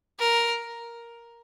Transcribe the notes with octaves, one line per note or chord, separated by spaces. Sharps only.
A#4